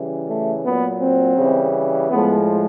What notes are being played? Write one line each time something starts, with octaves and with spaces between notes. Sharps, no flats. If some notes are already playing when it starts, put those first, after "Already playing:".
Already playing: C#3 E3 G3
A3
A#2 F#3 B3
C4
C#3 E3 G3
A2 F3 G#3 B3